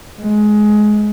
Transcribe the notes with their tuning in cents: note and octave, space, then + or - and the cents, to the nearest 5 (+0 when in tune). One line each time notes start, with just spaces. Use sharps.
G#3 +20